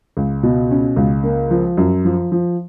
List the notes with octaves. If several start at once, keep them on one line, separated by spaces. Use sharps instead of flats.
C#2
B2
C#4
C#2
A#3
F3
F#2
F3
F3